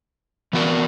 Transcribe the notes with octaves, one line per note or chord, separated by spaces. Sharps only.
E3 B3 F#4 A#4 D5